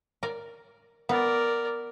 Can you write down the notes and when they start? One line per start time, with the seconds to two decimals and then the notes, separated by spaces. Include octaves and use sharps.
0.23 A#4 D5
1.09 B3 A#4 D5